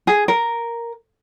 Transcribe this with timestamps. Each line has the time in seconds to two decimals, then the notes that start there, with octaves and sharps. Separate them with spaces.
0.07 G#4
0.28 A#4